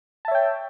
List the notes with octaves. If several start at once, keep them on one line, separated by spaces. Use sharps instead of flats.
C#5 E5 G5 A5